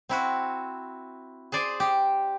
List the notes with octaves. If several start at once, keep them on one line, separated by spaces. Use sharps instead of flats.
C4 E4 F#4
G#4 C5 D5 G#5
G4